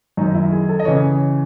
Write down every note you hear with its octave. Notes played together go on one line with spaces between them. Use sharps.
F#2 D#3 D#4
E4
G#4
A4
D#5
C#3 E3 C#5